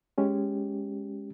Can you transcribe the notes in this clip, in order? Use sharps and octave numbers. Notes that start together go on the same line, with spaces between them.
G#3 C#4 G4